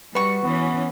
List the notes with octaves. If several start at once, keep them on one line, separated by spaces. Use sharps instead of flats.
G3 F#4 B4 C#6
E3 B3 C#4